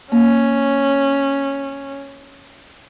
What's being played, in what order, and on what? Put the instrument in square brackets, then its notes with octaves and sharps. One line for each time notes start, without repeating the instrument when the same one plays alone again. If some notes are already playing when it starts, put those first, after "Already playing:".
[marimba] A#3 [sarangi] C#4